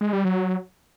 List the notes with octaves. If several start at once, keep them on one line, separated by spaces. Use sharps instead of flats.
G#3
G3
F#3